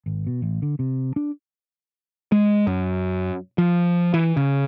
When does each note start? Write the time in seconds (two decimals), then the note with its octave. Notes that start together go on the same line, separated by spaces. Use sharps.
0.06 G#1
0.27 B2
0.42 A1
0.62 D3
0.79 C3
1.16 D4
2.32 G#3
2.67 F#2
3.58 F3
4.14 E3
4.37 C#3